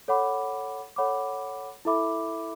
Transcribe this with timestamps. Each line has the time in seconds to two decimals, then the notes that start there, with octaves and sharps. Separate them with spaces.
0.08 A4 C#5 F#5 B5 D6
0.96 A4 C#5 F#5 B5 D6
1.85 E4 A4 E5 B5 D6